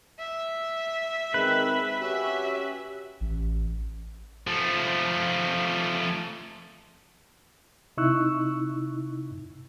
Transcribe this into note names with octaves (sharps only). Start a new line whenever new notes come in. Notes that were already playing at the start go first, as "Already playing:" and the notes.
E5
D#3 G#3 C4 B4
C#4 F#4 G4 E5
A1
F3 A3
C3 D#4 E4 C#6 E6 F#6